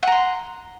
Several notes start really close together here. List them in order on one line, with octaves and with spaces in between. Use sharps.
F#5 A#5 C6